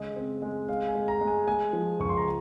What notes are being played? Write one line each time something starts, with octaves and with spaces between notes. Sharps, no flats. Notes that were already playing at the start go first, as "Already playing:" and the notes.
Already playing: C#3 G#3 D#5
C4
G#3
G#3 F5
G#5
G#3
A#5
G#3
G#5
G#3 G#5
F3
C#2 C#6
C6
A#5